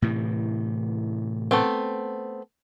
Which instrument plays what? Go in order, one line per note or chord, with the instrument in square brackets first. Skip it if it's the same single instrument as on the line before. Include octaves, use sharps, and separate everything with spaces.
[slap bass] A2 C3 E3
[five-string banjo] A3 B3 C4